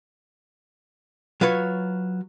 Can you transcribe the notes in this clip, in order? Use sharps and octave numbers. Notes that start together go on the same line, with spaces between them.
F#3 F4 B4 C#5